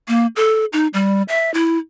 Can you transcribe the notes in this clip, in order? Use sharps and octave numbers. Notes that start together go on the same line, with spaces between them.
A#3
A4
D#4
G3
E5
E4